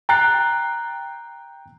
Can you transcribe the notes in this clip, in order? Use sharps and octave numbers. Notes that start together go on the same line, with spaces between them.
G5 A#5 F#6 A6 C7